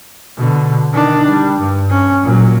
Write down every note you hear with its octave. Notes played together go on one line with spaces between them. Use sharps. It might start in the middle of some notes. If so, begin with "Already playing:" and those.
B2 D3
D#3 D4
G3
G2
C#4
A#2 F#3